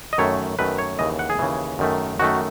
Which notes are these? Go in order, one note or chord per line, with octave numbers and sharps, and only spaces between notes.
D#5
F#2 D#3 A3 C#5
F#2 D#3 A3 B4
C#5
D#2 C#3 E3 D#5
F#5
G#4
D#2 C#3 E3
F#2 D#3 A3
F#2 D#3 A3 F#4